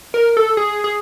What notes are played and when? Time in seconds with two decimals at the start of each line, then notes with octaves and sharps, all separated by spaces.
0.14 A#4
0.37 A4
0.57 G#4
0.84 G#4